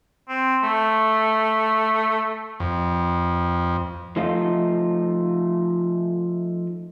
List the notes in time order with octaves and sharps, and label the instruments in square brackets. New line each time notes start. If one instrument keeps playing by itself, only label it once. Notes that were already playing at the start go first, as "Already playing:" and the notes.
[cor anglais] C4
A3
[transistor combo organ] F2
[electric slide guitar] F3 A3 D#4 F4